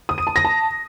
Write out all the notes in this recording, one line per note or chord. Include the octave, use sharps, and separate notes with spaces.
D#6
D#7
A5
A#6
A5